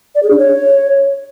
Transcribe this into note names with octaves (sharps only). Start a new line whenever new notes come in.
D5
G#4
D4
C#5